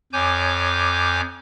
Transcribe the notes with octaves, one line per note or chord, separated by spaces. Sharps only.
F2 C#5 G#5 D6 G6